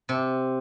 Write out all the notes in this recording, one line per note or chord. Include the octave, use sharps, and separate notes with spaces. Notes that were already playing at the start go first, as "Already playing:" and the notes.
C3